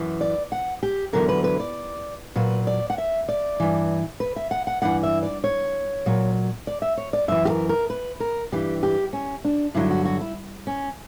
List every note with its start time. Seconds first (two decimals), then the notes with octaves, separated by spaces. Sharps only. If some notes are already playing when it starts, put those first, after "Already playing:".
Already playing: F#2 E3
0.21 D5
0.52 F#5
0.83 G4
1.13 E2 D3 F#3 A#4
1.29 B4
1.44 B4
1.60 D5
2.36 A#2 F#3 B4
2.67 D5
2.90 F#5
2.98 E5
3.29 D5
3.60 G2 E3
4.20 B4
4.36 E5
4.51 F#5
4.67 F#5
4.82 G2 E3 F#5
5.03 E5
5.23 D5
5.44 C#5
6.06 A#2 F#3
6.67 D5
6.82 E5
6.98 C#5
7.13 D5
7.28 F#2 E3 E5
7.45 G4
7.50 A#4
7.69 A#4
7.90 B4
8.20 A#4
8.52 G2 E3 G4
8.83 G4
9.13 C#4
9.45 D4
9.75 G2 D3 F#3 E4
9.91 F#4
10.05 F#4
10.21 E4
10.67 C#4